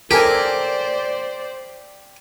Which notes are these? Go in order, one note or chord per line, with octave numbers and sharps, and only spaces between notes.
G4 A4 A#4 C5 D5 G#5